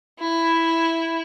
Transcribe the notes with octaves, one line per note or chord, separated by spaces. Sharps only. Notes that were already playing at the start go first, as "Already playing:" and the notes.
E4